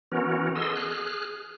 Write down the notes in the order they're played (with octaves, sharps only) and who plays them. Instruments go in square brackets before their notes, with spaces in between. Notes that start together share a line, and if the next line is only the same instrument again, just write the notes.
[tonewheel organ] E3 B3 C#4 F#4 A#4
G#4 A4 D#5 C6 E6
G#4 F6 F#6